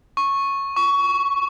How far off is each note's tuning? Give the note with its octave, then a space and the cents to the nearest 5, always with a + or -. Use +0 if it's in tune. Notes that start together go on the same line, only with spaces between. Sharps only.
C#6 -10
C#6 +20